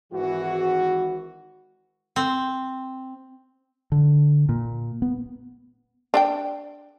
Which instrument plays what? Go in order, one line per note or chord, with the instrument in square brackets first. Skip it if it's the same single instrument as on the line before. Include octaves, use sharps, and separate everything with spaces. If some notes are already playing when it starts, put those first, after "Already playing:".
[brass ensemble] G#1 E3 F#4
[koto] C4
[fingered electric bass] D3
A#2
B3
[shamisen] D4 E5 G5